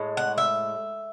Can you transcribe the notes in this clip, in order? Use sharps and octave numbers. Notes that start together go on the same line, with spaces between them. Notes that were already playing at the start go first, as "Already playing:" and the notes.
Already playing: A2 G#3
F#5
E5